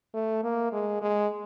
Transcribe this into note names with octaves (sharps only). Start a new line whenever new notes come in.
A3
A#3
G#3
G#3